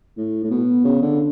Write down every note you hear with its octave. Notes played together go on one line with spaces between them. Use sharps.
A2
A2
B2
C#3
D3